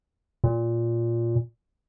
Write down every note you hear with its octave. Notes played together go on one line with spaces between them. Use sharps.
A#2